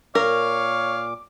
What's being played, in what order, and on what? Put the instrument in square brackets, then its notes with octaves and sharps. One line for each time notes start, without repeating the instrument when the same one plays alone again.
[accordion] A#2 D6 [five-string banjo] A#4 [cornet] C#5 [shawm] F5